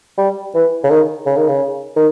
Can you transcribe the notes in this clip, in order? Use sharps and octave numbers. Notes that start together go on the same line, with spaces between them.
G3
E3
C#3
D#3
C#3
D#3
C#3
D#3